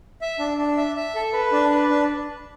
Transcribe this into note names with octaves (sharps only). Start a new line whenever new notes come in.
E5
D4
D4
E5
E5
A4
B4
D4
B4
D4